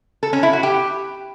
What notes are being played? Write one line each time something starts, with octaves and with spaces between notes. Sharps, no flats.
A4
C#4
E4
F#4
G4